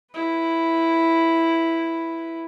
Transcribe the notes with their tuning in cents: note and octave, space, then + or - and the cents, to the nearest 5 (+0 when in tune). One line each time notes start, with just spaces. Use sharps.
E4 +0 B4 +0